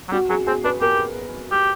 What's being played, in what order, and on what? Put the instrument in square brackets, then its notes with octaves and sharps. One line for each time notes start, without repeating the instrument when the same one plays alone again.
[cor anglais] F#3
[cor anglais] G3 [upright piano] F#4
[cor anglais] F#3 [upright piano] G#4
[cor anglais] C4 [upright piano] G#4
[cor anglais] D4 [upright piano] B4
[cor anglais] G4 [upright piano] A#4
[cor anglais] G4